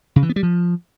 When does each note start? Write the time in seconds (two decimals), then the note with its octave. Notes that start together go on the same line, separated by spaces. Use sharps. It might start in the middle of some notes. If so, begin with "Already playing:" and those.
0.16 C#3
0.23 E3
0.29 B3
0.36 G3
0.43 F3